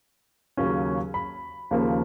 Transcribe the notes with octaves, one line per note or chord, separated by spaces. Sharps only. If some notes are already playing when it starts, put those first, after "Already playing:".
D#2 C#3 F#3 A#3 C#4
B5
D#2 C#3 F3 A#3